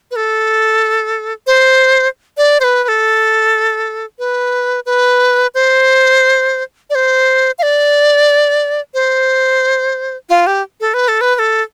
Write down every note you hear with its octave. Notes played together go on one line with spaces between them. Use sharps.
B4
A4
C5
D5
C5
B4
B4
A4
B4
B4
C5
D5
C5
F5
D5
C5
F4
G4
A4
B4
A4
B4
B4
A4